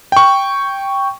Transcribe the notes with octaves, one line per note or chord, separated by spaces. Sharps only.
G5 C#6